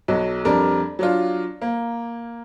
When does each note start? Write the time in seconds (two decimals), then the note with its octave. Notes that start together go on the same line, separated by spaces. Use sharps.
0.08 B1 F#3
0.45 F2 G3 D4 A#4
0.99 F#3 D4 F4
1.62 A#3